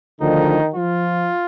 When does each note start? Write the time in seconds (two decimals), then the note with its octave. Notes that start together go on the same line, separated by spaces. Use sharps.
0.20 D2 D3 D#3 F3 D#4
0.74 F3 F4